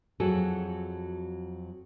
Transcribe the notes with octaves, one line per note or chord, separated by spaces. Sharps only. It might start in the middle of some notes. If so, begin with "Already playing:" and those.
F2 F#3 F#4 G#4 A4